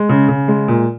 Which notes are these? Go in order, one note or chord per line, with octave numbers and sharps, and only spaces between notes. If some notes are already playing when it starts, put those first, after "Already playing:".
Already playing: G#3
C#3
C#3
G#3
A#2